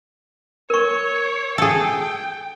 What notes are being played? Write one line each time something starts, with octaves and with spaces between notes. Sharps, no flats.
A#4 C#5 C#6
G#4 A4 G5